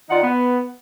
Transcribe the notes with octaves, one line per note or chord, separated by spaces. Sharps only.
D#3 D#4 F4 D5 F#5
B3